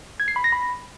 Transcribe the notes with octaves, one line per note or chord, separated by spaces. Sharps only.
G#6
C7
B5
A#6
B5